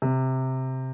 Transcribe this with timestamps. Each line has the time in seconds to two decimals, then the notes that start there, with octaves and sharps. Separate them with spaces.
0.02 C3